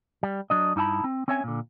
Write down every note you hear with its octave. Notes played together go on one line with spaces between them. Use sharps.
G3
F#3 D4 D#5
G2 D#4 E4 A5 B5
C4
C4 C#4 C#5 E5 G#5
A#2 D3